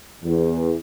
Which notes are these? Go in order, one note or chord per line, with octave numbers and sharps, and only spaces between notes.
E2